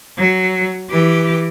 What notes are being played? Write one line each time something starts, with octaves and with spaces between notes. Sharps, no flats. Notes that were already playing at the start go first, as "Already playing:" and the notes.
F#3
E3 G4